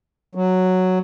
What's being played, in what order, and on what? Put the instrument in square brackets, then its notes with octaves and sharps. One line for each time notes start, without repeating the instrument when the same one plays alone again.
[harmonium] F#3